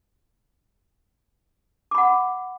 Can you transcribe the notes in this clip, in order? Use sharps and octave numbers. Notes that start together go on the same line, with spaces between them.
F#5 B5 D6